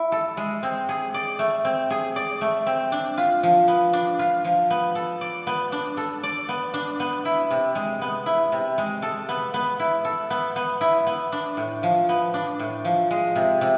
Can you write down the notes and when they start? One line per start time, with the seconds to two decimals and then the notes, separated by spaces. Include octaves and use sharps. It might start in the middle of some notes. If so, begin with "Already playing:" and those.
Already playing: E4
0.12 A4
0.37 G#3
0.63 C4
0.89 G#4
1.14 D5
1.39 A3
1.65 C4
1.90 G#4
2.16 D5
2.41 A3
2.66 C4
2.92 D4
3.17 F4
3.43 F3
3.68 B3
3.93 D4
4.19 F4
4.45 F3
4.70 B3
4.95 A4
5.21 D5
5.47 B3
5.72 D4
5.97 A4
6.23 D5
6.49 B3
6.74 D4
7.00 B3
7.25 E4
7.50 C3
7.75 G#3
8.01 B3
8.26 E4
8.52 C3
8.78 G#3
9.02 A4
9.29 B3
9.54 B3
9.79 E4
10.05 A4
10.30 B3
10.56 B3
10.81 E4
11.06 B3
11.32 D4
11.57 A2
11.83 F3
12.09 B3
12.34 D4
12.59 A2
12.85 F3
13.11 G#3
13.36 C3
13.61 C3